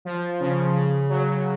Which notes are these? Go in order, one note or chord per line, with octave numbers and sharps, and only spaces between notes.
F3
C#3
C#3
F#3